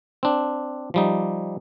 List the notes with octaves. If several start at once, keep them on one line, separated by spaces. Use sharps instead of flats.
C4 D4
F3 G3 D#4